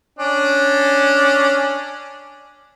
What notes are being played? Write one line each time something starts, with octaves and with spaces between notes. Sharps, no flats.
C#4 D4